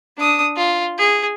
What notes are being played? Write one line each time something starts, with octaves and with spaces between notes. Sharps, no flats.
D4 D#6
F4
G#4